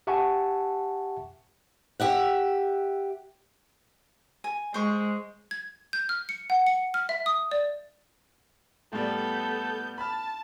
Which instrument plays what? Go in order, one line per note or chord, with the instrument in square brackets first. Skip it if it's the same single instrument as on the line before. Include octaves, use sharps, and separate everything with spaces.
[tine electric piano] G4 E5 F#5 G#5 A5 C#6
[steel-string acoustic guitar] G4 E5 F#5
[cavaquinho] G#5
[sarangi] G#3 [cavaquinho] C5 C#6
[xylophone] G#6
G6
F6
C#7
F#5
C#7
F6
E5
D#6
D5
[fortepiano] A2 G3 [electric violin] B3 G6 [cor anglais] A4
[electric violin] A5 [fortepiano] B5 F6